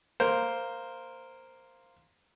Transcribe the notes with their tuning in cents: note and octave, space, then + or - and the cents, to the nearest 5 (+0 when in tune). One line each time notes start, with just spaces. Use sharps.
A#3 +0 C5 +0